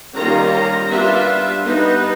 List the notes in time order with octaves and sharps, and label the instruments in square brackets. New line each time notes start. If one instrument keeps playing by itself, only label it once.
[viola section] D#3 G3 A#3 C#4 F4 A#5
A#5
G3 B3 D4 F4 E5
G3 B3 D#4 B4